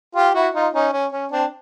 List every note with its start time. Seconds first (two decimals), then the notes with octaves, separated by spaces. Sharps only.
0.15 F4 G4
0.35 E4 F#4
0.54 D#4 F4
0.74 C#4 D#4
0.92 C#4
1.12 C#4
1.31 C4 D4